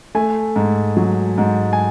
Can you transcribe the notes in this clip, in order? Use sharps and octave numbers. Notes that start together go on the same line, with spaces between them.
A3 G#5
G#2
F#3
G#2
G#5